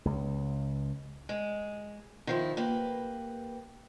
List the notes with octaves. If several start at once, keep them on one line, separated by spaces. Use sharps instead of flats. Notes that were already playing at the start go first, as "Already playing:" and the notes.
C#2
G#3
D#3 F3 E4
A#3 G4 B4